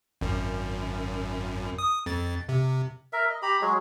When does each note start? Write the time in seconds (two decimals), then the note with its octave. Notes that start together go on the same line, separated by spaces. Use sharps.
0.21 G#1 F#2
1.79 D#6
2.06 F2 A6
2.49 C3
3.13 A#4 E5
3.30 D#5
3.42 G4 A#5 B5
3.61 F#3 G#3 G#4